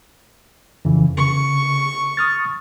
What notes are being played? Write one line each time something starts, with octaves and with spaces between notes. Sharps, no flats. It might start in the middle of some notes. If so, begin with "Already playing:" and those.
F2 C#3 E3
C#3 C#6
D#6 F6 A6